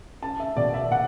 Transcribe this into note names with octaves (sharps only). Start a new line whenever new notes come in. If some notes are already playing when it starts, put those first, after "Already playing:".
C#4 A5
E5
B2 D5
E5
B2 F#5